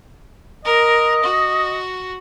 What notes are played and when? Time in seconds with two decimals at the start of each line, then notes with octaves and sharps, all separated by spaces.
0.65 A#4 D#5
1.24 F#4